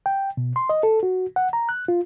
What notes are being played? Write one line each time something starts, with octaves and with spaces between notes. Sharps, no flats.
G5
B2
C6
D#5
A4
F#4
F#5
A#5
F#6
F4